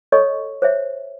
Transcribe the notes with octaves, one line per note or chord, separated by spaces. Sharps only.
A4 C#5 D#5 C#6
C5 C#5 E5